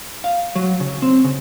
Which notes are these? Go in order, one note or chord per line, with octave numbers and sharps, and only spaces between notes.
F5
F#3
C#3
C4
C#3